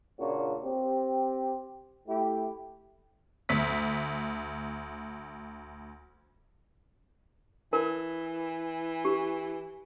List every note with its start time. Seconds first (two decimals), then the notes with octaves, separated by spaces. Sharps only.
0.19 A#2 C#3 A#3 D4 F4 F#4
0.64 C4 G4
2.08 A3 E4 G4
3.49 D2 B6
7.73 E3 A#4
9.05 G4